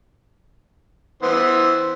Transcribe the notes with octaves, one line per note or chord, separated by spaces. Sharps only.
E3 B3 C5